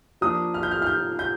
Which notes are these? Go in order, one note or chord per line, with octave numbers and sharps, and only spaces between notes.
F3 A#3 D4 D#6
F6
G6
F6
F6
G6
G6